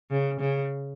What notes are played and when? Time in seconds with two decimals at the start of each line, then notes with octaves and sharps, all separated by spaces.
0.11 C#3
0.40 C#3